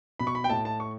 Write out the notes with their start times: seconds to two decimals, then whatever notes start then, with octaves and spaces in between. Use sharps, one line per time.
0.19 B2 B5
0.27 C#6
0.35 B5
0.44 G5
0.49 A2 A5
0.65 A5
0.80 C#6